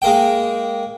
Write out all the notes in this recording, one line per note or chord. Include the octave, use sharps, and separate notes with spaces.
G#3 A#3 G5